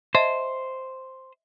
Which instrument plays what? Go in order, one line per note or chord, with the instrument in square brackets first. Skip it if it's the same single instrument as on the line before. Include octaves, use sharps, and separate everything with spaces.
[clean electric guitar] C5 [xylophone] D#5 E5 A5